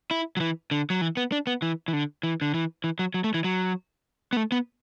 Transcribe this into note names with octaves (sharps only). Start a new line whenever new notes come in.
E4
F#3
E3
D3
F#3
E3
B3
D4
B3
E3
E3
D3
E3
D3
E3
E3
F#3
F#3
A3
E3
F#3
B3
A3
B3